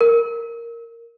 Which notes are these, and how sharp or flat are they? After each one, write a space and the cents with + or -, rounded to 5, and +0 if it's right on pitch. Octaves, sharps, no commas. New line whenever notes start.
A#4 -5